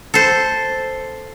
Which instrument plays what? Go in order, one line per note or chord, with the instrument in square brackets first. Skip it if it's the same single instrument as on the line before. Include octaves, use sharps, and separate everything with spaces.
[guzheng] A4 C5